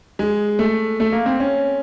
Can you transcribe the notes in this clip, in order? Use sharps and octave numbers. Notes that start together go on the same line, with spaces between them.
G#3
A3
A3
A#3
C4
C#4